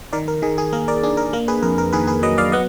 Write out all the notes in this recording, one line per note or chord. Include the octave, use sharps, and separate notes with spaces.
D#3 A#4 D5
A#4
D#3 G#4
G#4
A#3 A#4
A#4 D5
D4 G#4
A#4
A#3 A#4
G#4 B4
F2 A#4
A#4
D#3 G#4 B4
G#4 B4
F#3 B4 D#5
D5 F5
B3 D#5 F#5